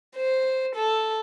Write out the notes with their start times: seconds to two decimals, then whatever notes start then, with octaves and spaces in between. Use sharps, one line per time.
0.17 C5
0.76 A4